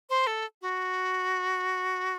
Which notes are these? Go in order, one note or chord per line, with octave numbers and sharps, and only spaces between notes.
C5
A4
F#4